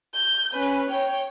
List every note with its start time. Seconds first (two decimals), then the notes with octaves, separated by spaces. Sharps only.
0.15 G6
0.54 C#4 B4
0.90 C#5 G5